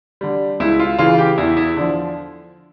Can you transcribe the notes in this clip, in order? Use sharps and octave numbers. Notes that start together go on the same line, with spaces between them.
D3 G3
C#2 E4
F4
C#3 E3 F4
G4
E2 E4
E4
D3 F3 D4